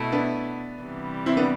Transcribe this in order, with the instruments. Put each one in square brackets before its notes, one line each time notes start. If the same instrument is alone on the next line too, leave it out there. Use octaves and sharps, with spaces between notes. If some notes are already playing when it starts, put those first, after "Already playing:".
Already playing: [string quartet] B2 A3 E4
[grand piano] B3 D4
[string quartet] C3 E3 G3
[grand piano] C4 E4
B3 D4